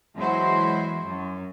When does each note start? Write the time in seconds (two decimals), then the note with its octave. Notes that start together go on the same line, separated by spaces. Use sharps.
0.16 E2 F#3 G#3 E4 F#4 C5
1.05 F#2